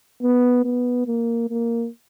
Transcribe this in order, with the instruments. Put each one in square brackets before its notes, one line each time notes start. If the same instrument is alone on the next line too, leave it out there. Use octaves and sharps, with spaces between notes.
[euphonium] B3
B3
A#3
A#3